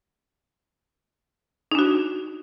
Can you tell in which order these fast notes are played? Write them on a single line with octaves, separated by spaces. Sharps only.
D#4 D4 F#4